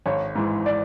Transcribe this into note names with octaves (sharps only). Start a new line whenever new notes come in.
G#1 C#5
G#2 E3
D5